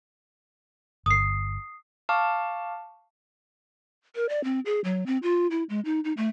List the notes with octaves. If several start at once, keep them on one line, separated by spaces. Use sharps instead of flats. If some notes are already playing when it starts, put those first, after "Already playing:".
G1 D#6 C7
F5 A5 C#6 D6 F6
A#4
D5
C4
G#4
F#3
C4
F4
E4
G#3
D#4
D#4
A3